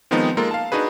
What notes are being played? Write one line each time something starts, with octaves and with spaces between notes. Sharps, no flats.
D#3 F3 G#3 B3 C4 D#4
G#3 A#3 F4 A4 A#4
F5 A5
D4 D#4 F#4 G#4 B4